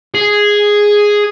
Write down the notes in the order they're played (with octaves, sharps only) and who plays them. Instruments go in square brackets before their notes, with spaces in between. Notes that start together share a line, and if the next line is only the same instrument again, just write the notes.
[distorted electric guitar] G#4